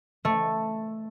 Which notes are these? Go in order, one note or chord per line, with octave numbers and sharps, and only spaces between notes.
A3